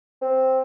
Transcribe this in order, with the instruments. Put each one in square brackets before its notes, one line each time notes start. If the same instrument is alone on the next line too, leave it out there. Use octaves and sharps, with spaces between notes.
[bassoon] C4